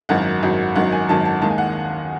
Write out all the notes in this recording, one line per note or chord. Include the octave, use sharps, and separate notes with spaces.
G#1 F#2 D#3 F#3 F#5
G#1 F#2 D#3 F#3
G#1 F#2 D#3 F#3 F#5
G#5
G#1 F#2 D#3 F#3 A5
A5
D#2 D#3 G#3 A5
G#5
F#5